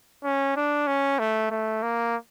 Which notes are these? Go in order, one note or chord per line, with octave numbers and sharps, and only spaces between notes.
C#4
D4
C#4
A3
A3
A#3